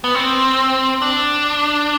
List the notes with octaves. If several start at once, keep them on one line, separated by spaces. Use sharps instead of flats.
B3
C4
D4